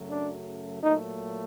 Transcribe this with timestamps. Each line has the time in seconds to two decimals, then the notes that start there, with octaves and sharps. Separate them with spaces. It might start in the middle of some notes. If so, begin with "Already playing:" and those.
Already playing: F#2 C#3 F#3 A3
0.10 D4
0.82 A#2 F#3 A3 D#4